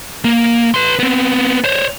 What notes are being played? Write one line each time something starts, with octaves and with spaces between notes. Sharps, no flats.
A#3
B4 C6
B3 C4
C5 C#5